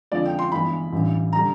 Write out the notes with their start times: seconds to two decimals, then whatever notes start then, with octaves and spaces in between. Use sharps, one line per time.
0.11 F2 D3 F3 G#3 D5
0.25 G5
0.39 C6
0.52 G1 G2 E3 G#3 B5
0.93 A1 G2 E3 G3
1.33 D3 G3 A#5